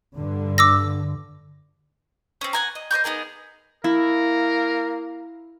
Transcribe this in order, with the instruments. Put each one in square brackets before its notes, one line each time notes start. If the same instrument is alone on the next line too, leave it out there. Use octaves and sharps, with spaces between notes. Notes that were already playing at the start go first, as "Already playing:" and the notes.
[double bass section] G2 D3
[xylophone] D6 E6 A#6
[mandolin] C4 C#4
F#5 G#5 A#5
D#5
C5 D#5 C#6 G6
B3 D#4 G#4 A#4
[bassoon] A#3 [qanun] E4 [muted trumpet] A#4